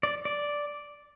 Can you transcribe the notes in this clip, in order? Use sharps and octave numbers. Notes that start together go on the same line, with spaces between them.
D5
D5